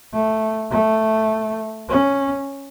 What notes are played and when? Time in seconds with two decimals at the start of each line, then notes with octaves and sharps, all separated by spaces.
0.13 A3
0.71 A3
1.89 C#4